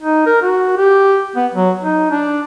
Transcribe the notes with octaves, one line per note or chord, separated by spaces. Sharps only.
D#4
A#4
F#4
G4
B3
F#3
D#4
D4